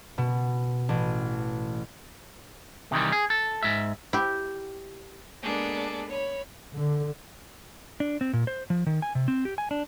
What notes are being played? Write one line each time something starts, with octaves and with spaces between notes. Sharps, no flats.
B2
A1
C3 D#3 E3 G3
G#4
A4
G#2 E5
E4 G4
G#3 A#3 B3 D4 G#4 A4
C#5 B5
D3
D4
C4
A#2
C5
F3
D#3
G#5
C3
C4
G4
G#5
D4